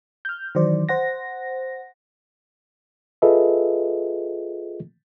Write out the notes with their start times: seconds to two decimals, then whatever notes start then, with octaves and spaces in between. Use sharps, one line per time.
0.25 F6 G6
0.55 D#3 E3 F#3 C5 D5
0.89 C5 F#5 A#6
3.22 F4 G#4 A4 B4 D#5 E5